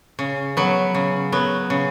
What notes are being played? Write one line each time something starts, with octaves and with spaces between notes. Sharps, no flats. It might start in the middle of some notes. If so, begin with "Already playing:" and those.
C#3
F#3 B3
C#3
F#3 B3
C#3